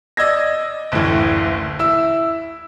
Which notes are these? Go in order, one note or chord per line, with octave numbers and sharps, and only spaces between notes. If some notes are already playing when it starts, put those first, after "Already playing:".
D5 D#5 E6 G#6 A#6
F#1 D2 A2 E3
E4 E6